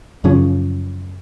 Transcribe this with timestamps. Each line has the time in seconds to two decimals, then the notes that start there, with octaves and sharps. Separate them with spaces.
0.24 F#2 C#3 F3 C#4